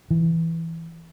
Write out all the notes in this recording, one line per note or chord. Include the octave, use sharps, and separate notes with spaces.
E3